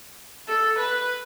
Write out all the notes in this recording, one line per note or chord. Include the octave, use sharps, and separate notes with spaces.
A4
B4